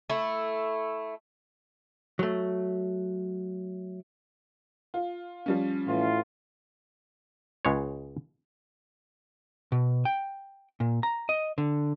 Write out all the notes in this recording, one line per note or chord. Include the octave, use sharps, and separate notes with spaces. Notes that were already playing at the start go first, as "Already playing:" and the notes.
A3 E4
F#3 A3
F4
F3 G3 C#4
A2 E3 F4
C#2 G#3 C#5
B2
G5
A#2
A#5
D#5
D3